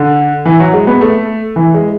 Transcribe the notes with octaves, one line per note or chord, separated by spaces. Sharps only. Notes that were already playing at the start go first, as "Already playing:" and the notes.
Already playing: D3
E3
F#3
G#3
B3
A3
E3
G#3